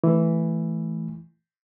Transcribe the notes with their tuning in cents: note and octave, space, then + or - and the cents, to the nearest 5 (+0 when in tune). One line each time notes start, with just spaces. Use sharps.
E3 +0 A3 +0